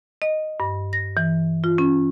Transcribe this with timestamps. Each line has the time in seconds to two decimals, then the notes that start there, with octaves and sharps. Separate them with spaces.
0.22 D#5
0.60 G2
0.93 A#6
1.17 E3
1.64 F4
1.78 C#4